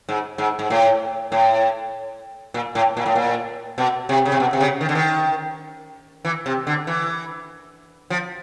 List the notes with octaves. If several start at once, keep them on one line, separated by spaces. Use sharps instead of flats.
G#2
G#2
G#2
A2
A2
A#2
A2
A#2
A2
A#2
B2
C3
C#3
C3
B2
C3
C#3
D#3
D3
D#3
E3
C3
D3
E3
F3